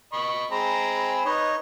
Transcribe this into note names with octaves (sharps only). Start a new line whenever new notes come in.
D#5 B5 C#6
G#3 C4 G#5 A#5 B5
D#4 B4 C#5 D#5